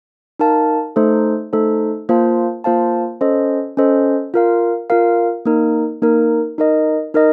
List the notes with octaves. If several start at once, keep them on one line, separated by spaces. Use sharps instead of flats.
D#4 A#4 F5 A5
A3 D#4 A4 C5
A3 D#4 A4 C5
A#3 F4 C5 F5 A5
A#3 F4 C5 F5 A5
C#4 A4 C5 D#5
C#4 A4 C5 D#5
F4 A#4 F5
F4 A#4 F5
A#3 D#4 A#4
A#3 D#4 A#4
D#4 A#4 D#5
D#4 A#4 D#5